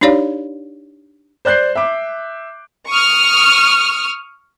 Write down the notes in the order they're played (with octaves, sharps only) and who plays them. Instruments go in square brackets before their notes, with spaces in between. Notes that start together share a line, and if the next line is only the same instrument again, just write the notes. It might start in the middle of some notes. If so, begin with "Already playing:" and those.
[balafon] D4 D#4 G4 C#5 D5 F5
[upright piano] C5 D5 F#6 G6 C7
E5 D6
[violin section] C#6 D#6 F6